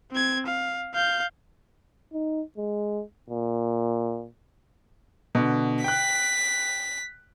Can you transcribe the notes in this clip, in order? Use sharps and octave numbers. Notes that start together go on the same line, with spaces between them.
C4 G#6
F5
F5 G6
D#4
G#3
A#2
B2 D3
G5 F#6 B6